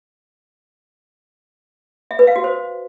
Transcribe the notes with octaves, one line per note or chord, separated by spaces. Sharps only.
E5
B4
F5
F#4
C5